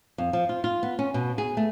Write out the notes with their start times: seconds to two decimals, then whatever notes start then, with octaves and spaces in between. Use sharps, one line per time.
0.18 F2
0.33 F3
0.49 F4
0.64 F4
0.83 B3
0.99 C#4
1.14 B2
1.38 G#4
1.57 A3